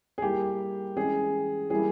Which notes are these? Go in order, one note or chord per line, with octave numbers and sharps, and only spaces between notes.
G#4
G3 A#3 E4 G4
E3 G#3 C#4 G#4
E3 G3 A#3 E4 G#4